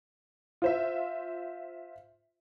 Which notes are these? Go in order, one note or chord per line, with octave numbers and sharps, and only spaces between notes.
F4 C5 E5